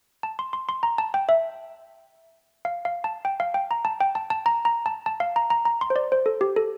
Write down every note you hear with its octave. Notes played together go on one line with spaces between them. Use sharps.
A5
C6
C6
C6
A#5
A5
G5
E5
F5
F5
A5
G5
F5
G5
A#5
A5
G5
A5
A5
A#5
A#5
A5
A5
F5
A#5
A#5
A#5
C6
C5
D5
C5
A4
G4
A4